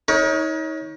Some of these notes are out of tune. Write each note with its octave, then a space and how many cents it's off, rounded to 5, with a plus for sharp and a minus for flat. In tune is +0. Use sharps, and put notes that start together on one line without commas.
D#4 +30 A#4 +40 C#5 +0